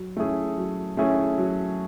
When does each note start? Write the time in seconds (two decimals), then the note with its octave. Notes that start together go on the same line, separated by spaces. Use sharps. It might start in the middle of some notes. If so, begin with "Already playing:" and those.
Already playing: F#3
0.17 A3 C#4 E4 G#4
0.57 F#3
0.97 A3 C#4 E4 G#4
1.38 F#3